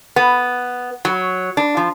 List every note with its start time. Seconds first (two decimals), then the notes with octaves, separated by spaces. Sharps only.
0.16 B3
1.05 F#3
1.57 D4
1.77 F3